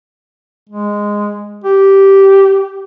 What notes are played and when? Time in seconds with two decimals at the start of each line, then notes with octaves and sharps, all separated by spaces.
0.69 G#3
1.64 G4